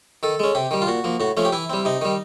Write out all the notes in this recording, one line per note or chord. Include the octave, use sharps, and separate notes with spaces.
D#3 A4
G#3 C#4
C3 G4
D#3 G3
F4
A#2 F#4
F3 A#3
A2 F#4
F3 A3 C#4
G4
E3 E4
G3 C4
C3 D#4
D#3 G3